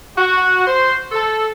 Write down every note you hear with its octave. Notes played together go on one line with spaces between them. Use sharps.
F#4
C5
A4